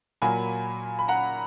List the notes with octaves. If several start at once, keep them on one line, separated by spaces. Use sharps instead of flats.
A#2 F#3 A#3 G#5 B5
B5
F#5 A#5